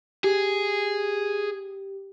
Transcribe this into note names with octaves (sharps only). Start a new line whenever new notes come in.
G4 G#4